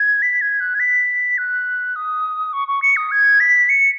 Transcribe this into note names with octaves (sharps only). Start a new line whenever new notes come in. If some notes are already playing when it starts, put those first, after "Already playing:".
Already playing: G#6
B6
G#6
F#6
G#6
B6
F#6
D#6
C#6
C#6
C#7
D#6
G#6
B6
C#7